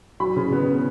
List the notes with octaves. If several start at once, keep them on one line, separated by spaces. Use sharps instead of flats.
F#3 B5
C#3
B3